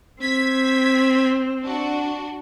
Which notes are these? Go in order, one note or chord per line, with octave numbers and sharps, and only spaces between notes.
C4 G#6 B6
D4 F#4